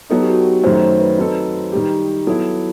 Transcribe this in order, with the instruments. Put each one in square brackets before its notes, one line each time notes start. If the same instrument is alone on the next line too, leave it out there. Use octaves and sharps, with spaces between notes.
[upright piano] F#3 B3 D#4 [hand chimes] A4
[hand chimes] G4
F#4
G4
[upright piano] F#2 D#3 F#3 A3 [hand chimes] C5
[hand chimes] C5
B4
[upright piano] F#3 C4 D#4 A4
D#3 G3 D#4 G4
[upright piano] F#3 B3 E4 [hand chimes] A4